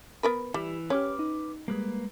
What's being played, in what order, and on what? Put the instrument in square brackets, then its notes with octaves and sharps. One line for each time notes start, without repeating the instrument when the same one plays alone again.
[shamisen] B3 A#4 B4
[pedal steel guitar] E3 E4 [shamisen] G3
[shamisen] C#4 [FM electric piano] G4 C#5 [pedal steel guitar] B4 D6 F6
[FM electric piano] D#4
[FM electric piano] G3 G#3 [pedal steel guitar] A#3 B4